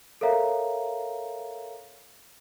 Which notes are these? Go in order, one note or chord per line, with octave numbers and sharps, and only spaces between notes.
A4 A#4 C#5 E5 F5 A#5